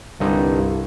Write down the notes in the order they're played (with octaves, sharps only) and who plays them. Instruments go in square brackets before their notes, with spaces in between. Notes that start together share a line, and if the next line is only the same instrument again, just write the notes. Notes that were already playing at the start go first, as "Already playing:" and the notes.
[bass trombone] C2 [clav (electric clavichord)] G2 D3 D#4